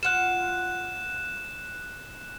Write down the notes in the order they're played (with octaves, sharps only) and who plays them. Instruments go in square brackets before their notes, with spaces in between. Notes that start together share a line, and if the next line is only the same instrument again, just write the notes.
[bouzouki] F4 F#5 [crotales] F#6 E7